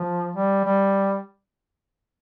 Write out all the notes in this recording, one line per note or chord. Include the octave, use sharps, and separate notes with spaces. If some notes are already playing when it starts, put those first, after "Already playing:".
Already playing: F3
G3
G3